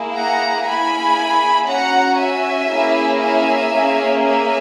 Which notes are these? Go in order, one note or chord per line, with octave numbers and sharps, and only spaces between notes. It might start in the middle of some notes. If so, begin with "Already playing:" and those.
Already playing: A#3 E4 G#4
F#5 A#5
A#3 E4 G#4 G#5 B5
C#4 F#4 F#5 A#5
E5 G#5
A#3 C#4 E4 G#4
E5 G#5
A#3 C#4 G#4
E5 G#5